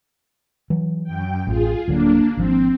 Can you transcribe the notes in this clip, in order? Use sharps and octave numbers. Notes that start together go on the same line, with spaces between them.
E3 F#3
F#2 G5
A1 F4 G#4
D1 D3 F#3 A#3 D4
G#1 F3 C4